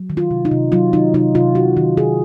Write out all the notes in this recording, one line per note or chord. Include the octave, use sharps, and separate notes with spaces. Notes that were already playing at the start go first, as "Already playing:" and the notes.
Already playing: F#3
D#3
F4
C3
D#4
C3
F#3 F4
D#3 D#4
C3 D#4
C3 F4
F#3 F#4
D#3
C3 G#4